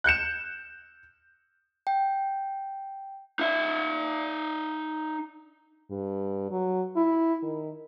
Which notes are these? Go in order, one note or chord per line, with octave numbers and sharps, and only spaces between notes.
F#6 G6 C#7 E7
G5
D#4 E5
G2
F#3
E4
D#3